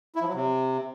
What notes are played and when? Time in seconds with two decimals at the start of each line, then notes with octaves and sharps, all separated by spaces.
0.15 E4
0.22 F3
0.28 F#3
0.34 C3